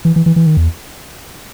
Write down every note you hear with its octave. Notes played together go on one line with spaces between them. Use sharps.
E3
E3
E3
E3
D#3
E2